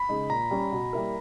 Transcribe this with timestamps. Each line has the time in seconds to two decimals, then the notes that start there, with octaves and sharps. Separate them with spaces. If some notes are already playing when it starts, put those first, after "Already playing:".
Already playing: B5
0.09 C#3 G#3 D#4
0.30 A#2 A#5
0.51 G3 C#4
0.72 B2
0.93 G3 A#3 E4 A#4